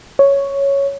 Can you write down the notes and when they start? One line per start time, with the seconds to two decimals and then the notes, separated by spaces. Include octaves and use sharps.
0.19 C#5